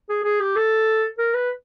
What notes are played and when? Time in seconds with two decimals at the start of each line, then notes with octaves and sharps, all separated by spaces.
0.09 G#4
0.24 G#4
0.40 G4
0.56 A4
1.18 A#4
1.34 B4